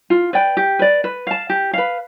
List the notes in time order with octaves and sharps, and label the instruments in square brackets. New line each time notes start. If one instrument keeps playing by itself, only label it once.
[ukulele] F4
B4 D5 G5
G4
B4 D5
B4
F5 A5
G4
B4 F5